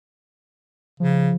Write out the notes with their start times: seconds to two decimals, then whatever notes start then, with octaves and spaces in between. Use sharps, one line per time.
1.00 C#3 F3